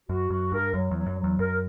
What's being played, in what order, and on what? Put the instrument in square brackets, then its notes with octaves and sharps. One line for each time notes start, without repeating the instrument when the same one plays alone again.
[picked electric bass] F#2 [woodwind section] F#4
[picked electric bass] F#2 [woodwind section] F#4
[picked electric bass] G2 [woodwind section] A#4
[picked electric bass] F#2 [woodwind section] F#3
[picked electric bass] E2 [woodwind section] F#3
[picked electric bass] F#2
[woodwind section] F#3
[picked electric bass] E2
[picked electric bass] F#2 [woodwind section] A#4